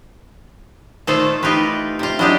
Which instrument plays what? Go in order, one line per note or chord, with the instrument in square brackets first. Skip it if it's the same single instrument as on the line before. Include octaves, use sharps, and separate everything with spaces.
[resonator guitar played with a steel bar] A#2 D#3 C5 [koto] A3 F4 A4
[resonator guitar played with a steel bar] E3 D#4 [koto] F4 G4 B4
[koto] C3 F4
[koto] F#3 D4 G4 [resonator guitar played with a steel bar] E4 D#5